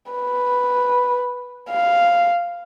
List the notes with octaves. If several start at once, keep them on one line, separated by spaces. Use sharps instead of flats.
B4
F5